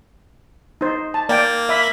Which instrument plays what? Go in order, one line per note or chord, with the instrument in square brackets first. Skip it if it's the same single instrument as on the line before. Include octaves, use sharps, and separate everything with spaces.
[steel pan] D#4 C5
A5
[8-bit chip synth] A#3 [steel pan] D5 G5
[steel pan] E5 B5